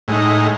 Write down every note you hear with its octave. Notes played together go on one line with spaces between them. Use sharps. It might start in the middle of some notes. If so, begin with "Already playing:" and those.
A2 G#3 D#4